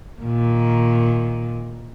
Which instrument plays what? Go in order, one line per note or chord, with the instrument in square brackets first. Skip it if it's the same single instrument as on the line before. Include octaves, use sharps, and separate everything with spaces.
[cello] A#2 D#3